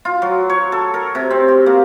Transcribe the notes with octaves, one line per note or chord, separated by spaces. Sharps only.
F4
F#3
C#5
A4
A#4
C3
C4
G4
A#3